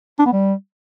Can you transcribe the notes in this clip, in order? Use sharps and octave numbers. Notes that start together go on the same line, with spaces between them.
D4
B3
G3